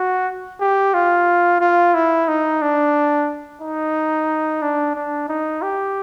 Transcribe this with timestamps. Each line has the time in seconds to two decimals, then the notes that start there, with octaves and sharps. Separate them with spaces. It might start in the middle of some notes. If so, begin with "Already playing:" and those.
Already playing: F#4
0.60 G4
0.94 F4
1.61 F4
1.94 E4
2.28 D#4
2.62 D4
3.61 D#4
4.62 D4
4.95 D4
5.29 D#4
5.62 G4